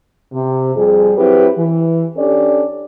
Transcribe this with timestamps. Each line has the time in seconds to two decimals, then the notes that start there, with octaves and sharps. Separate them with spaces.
0.33 C3
0.76 F2 G3 G#4
1.17 F#3 C4 E4 G4 B4
1.58 E3
2.17 C#4 D4 G4 A4 D5